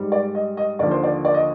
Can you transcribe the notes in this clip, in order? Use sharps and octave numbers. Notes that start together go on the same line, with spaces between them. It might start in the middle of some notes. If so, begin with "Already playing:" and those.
Already playing: G#2 G3
D5
D#5
D#5
D#2 D3 F3 D5
C5
D5
D5
D#5